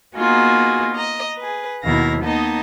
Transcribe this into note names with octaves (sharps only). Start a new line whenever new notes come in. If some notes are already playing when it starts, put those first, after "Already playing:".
A#3 B3 D#4 F4 F#4 G#4
D#5 A#5
G#4 B4
D#2 B2 D#3 E4 F5 A#6
A#3 B3 D#4 D#5 A5